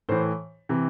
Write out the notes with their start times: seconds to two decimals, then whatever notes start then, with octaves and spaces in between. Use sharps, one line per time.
0.09 A2 E3 C5
0.69 C3 E3